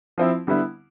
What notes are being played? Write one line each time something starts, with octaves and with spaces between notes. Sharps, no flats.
F3 C4 E4
D3 G3 B3 E4